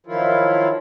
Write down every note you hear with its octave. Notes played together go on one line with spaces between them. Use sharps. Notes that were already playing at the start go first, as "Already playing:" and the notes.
D#3 F3 F#3 E4 F4